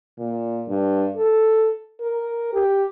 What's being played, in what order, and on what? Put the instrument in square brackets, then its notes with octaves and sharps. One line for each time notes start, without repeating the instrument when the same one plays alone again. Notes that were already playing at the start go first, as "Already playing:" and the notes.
[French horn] A#2
G2
A4
A#4
G4